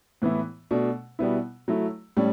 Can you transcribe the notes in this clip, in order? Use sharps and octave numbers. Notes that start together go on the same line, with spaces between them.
A2 E3 B3 E4
B2 A3 D4
B2 G3 B3 E4
F#3 A3 E4
A2 G3 C#4